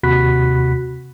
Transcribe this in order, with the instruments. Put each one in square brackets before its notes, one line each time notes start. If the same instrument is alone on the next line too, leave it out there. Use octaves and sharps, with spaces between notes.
[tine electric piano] D#2 C3 F#4 B5 F#6 B6